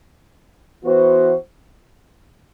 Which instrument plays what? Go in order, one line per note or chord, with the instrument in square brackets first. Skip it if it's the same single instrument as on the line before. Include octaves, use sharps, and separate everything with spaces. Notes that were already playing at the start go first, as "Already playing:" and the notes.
[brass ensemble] E3 B3 F#4 C5